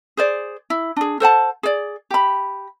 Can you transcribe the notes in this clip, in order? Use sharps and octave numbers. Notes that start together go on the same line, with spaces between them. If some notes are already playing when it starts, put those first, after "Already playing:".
G#4 C5 D5
E4
D4 G#4
A4 C5 F#5 A5
G#4 D5
G4 B5